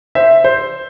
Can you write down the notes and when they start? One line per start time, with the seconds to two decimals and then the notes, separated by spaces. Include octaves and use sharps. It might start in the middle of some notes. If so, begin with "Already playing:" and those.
0.15 C5 E5
0.44 C5